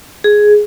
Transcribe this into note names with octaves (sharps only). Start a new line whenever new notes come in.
G#4